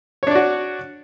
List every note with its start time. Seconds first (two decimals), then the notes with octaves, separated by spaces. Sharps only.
0.23 C#5
0.27 D4
0.31 D5
0.35 F#4